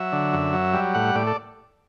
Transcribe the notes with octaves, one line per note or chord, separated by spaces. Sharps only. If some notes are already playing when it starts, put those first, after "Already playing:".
Already playing: F#3 E5
D3
F#2
F#3
G3
A2 F#5
A2 D5
A4